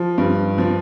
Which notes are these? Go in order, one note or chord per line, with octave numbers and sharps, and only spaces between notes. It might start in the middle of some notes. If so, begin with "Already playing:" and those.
Already playing: F3
G2
F3